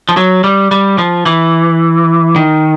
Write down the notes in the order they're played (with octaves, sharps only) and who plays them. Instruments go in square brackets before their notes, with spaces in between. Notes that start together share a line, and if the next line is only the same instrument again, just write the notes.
[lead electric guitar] F3
F#3
G3
G3
F3
E3
D#3